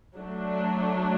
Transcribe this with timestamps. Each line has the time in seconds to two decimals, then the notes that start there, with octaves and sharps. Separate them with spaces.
0.16 F#3 A3 D4